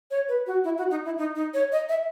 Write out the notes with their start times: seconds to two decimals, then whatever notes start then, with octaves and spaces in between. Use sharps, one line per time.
0.11 C#5
0.29 B4
0.47 F#4
0.64 E4
0.78 F#4
0.91 D#4
1.05 E4
1.18 D#4
1.36 D#4
1.54 C#5
1.72 D#5
1.89 E5